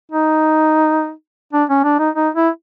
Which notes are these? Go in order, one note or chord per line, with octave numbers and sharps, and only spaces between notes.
D#4
D4
C#4
D4
D#4
D#4
E4